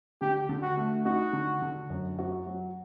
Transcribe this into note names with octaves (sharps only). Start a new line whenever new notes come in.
D3 G4
D3
F#4
A3
D#4 F#4
D3
D3
F#2
F#4
F#3